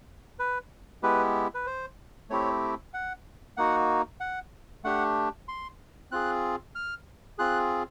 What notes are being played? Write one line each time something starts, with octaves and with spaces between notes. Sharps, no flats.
B4
G#3 B3 E4 G4 B4
B4
C5
A3 C4 E4 G4 C#5
F#5
A#3 D#4 F#4 F#5
F#5
A3 D4 G4 F#5
C6
C4 F4 G#4 F#6
F6
C4 F4 G#4 F#6